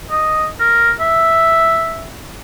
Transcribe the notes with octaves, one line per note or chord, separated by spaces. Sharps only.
D#5
A#4
E5